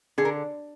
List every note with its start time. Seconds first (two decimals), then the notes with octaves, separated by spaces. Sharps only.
0.18 D3 G#4
0.25 A#4